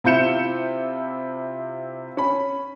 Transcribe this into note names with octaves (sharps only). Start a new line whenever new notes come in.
C3 E4 F4 G6 C#7 E7
C#4 B5